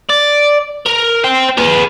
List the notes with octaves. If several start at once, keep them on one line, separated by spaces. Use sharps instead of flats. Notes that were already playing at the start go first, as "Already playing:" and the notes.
D5
A#4
C5 G5
G#4 B4